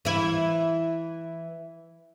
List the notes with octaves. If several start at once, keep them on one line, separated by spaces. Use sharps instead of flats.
E3 E4